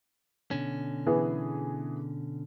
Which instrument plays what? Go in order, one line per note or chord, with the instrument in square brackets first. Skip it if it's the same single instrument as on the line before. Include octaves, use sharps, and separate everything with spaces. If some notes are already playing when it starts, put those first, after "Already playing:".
[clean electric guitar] B2 D3 C#4
[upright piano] E3 B3 G#4